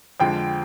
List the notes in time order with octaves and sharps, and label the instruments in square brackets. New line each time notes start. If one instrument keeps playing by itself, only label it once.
[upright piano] F2 D3 F3 G#3 G5